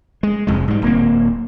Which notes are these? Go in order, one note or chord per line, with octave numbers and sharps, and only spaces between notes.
G#3
F1 F2 G#3
G#2 G3
D1 A#3 C4